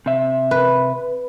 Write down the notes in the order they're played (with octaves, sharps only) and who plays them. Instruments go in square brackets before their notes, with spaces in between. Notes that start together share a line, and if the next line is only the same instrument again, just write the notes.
[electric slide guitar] C3 E5
[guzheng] B4